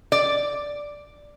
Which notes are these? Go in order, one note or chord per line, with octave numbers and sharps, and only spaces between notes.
D5